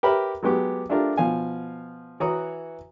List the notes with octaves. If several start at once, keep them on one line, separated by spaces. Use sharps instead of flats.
G4 A#4 B4 C#5 E5 B5
F#3 G#3 B3 G4 D6
A3 D4 F4 G4 A#4
B2 F3 F5 G#5
E3 F#4 C#5 A#5 D#6